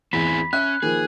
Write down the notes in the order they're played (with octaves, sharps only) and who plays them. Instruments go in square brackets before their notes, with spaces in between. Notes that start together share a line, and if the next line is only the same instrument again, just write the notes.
[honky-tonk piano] E2 [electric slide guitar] C4 E4 G#4 [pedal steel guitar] B5
[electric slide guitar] C#4 [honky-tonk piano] E5 D#7 [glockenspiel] F#6
[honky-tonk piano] D#3 F3 A#3 [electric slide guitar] G#4